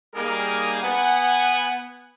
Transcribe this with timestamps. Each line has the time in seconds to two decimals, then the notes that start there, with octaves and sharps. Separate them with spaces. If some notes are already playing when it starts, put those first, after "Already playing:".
0.15 G3 A#3 D#4 G#4 A#4 G#5
0.82 B3 F#5 G#5